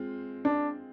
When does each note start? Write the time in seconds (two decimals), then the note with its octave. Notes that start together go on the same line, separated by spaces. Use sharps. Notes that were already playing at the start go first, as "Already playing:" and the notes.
Already playing: G#3 C4 F4
0.45 D4